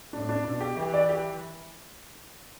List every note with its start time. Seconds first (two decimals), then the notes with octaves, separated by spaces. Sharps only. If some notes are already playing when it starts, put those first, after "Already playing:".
0.13 A2 D4
0.29 D4
0.44 B2 D4
0.61 G4
0.77 E3 G4
0.93 D5
1.09 G4